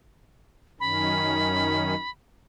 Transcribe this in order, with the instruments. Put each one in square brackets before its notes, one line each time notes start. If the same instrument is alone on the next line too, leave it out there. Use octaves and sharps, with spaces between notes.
[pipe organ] F#2 D#3 C#4 [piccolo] B5